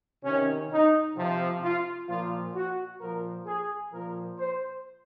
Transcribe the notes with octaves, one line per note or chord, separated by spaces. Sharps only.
C3 D#3 C#4
D#4
C3 F3
F4
A#2 F3 F4
F#4
A#2 F3 A#4
G#4
A#2 F3 A#4
C5